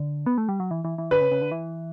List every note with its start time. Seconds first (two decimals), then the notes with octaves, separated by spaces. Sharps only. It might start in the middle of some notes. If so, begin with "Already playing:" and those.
Already playing: D3
0.26 B3
0.38 A3
0.49 G3
0.60 F#3
0.71 E3
0.85 E3
0.98 E3
1.11 D3 B4
1.21 C#3
1.31 C#3
1.41 D3
1.51 E3